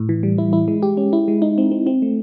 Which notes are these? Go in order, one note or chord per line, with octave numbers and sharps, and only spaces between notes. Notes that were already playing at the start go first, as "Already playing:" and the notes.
Already playing: A2
E3
G3
E4
E4
G#3
G4
C#4
E4
G#3
D#4
C4
C4
C4
A3